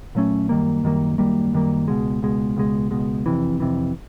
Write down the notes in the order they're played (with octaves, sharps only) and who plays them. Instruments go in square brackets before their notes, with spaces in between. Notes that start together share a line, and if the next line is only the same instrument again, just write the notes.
[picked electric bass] A#2 F#3 A3 C#4
F#2 D#3 G3 A#3
F#2 D#3 G3 A#3
F#2 D#3 G3 A#3
F#2 D#3 G3 A#3
C#2 B2 G#3
C#2 B2 G#3
C#2 B2 G#3
C#2 B2 G#3
F2 C3 E3
F2 C3 E3